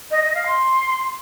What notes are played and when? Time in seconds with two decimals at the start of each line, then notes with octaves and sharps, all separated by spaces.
0.11 D#5
0.23 D#5
0.35 F5
0.46 C6